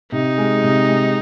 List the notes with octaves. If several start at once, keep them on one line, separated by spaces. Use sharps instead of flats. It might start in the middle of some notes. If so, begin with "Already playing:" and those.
C3 D#4
G#3
C3
G#3